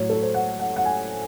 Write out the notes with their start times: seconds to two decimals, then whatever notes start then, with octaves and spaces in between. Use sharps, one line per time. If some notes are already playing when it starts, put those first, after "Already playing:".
Already playing: A2 F#3 C#5
0.10 A4
0.22 C5
0.34 F#5
0.60 F#5
0.76 F#5
0.85 G#5